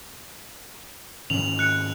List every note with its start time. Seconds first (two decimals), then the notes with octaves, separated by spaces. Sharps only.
1.30 G#2 D#3 C#4 F7 F#7
1.59 F#6 C#7